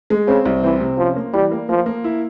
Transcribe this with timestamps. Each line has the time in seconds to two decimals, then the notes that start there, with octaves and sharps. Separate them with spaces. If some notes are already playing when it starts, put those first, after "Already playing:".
0.10 G#3
0.27 C#3 C4
0.45 C2
0.63 E3 C4
0.81 C3
0.98 F3 C#4
1.16 A#3
1.34 E3 G3
1.51 A#3
1.69 F3 A#3
1.86 A#3
2.04 E4